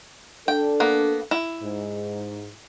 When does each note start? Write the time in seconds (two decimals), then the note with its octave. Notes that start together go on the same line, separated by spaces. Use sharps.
0.48 D4 A4 G5
0.80 A#3 B3
1.31 E4
1.63 G#2